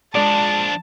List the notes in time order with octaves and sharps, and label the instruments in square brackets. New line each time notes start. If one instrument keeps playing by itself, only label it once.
[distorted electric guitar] F3 D4 [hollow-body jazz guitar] G#3 D5 [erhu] A5